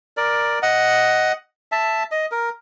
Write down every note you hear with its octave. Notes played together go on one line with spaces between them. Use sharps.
A#4 D5
D#5 F#5
E5 A5
D#5
A#4